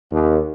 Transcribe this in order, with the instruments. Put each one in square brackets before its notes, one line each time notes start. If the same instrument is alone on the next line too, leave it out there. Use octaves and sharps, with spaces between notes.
[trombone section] D#2